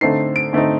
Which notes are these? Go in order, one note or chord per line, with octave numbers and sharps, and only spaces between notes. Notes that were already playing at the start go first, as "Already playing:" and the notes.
D3 A3 C4 D#4 C7
D7
D3 A3 C4 D#4